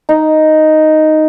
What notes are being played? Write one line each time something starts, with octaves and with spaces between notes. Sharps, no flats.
D#4